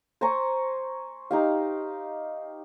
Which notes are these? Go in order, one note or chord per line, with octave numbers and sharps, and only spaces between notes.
C5 G#5 A#5 C#6
D#4 G4 F5